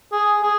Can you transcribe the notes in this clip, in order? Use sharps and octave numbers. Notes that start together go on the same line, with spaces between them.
G#4
G#4